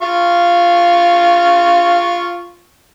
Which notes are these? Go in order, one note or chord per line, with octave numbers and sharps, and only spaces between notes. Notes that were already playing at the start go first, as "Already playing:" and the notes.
F4 F5 C#6